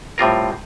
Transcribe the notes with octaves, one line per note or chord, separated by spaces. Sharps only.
A2 G3 C4 F4 A#4